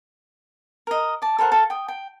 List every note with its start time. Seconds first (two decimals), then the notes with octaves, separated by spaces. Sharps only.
0.87 A#4 D#5
1.22 D5 A5
1.39 A4 A#4 C5 F#5
1.52 A4 F5
1.70 G5 D#6
1.88 G5